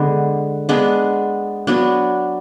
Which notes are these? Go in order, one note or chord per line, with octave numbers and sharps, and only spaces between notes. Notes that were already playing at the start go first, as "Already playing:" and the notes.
Already playing: D3 G#3 B3
G#3 B3 D4
F#3 B3 D4